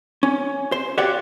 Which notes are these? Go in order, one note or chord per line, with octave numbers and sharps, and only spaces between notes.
C#4
C5
F#4 G4 C#5 D5 F5 F#5